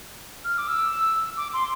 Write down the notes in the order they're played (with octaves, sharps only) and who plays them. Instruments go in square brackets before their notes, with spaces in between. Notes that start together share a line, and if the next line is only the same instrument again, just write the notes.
[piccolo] F6
D6
E6
D6
C6